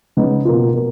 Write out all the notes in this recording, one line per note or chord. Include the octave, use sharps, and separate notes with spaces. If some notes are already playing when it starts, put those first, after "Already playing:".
C#3 G#3 B3 D#4
B2 A#3 F4
B2 A#3